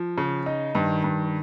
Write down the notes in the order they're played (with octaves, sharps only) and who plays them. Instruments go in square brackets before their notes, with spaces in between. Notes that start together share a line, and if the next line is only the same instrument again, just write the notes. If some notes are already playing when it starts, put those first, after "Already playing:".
Already playing: [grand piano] F3
C#3
D#4
[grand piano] G2 [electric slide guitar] D#3
[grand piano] G2